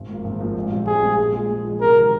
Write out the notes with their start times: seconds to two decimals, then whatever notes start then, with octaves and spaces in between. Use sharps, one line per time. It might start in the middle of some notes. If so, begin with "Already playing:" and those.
Already playing: G#1
0.08 G#2 F3 A#3
0.24 G#1
0.39 G#2 F3 A#3
0.55 A#1
0.71 G#2 G3 C4
0.86 A#1 G#4
1.03 G#2 G3 C4
1.19 A#2
1.33 F3 G#3
1.49 A#2
1.65 F3 G#3
1.81 C3 A#4
1.96 D#3 G#3 C4 G4